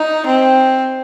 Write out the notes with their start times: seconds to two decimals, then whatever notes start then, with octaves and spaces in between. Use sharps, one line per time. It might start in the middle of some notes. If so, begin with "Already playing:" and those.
Already playing: D#4
0.26 C4